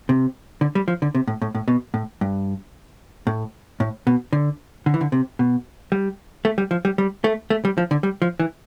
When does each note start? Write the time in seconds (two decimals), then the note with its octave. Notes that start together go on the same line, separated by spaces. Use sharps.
0.09 C3
0.61 D3
0.75 G3
0.88 F3
1.02 D3
1.15 C3
1.27 A2
1.42 A2
1.55 A2
1.68 B2
1.94 A2
2.21 G2
3.27 A2
3.80 A2
4.07 B2
4.33 D3
4.86 D3
4.94 E3
5.01 D3
5.12 C3
5.39 B2
5.92 G3
6.45 A3
6.58 G3
6.71 F3
6.85 G3
6.98 G3
7.24 A3
7.50 A3
7.65 G3
7.78 F3
7.91 D3
8.03 G3
8.22 F3
8.40 E3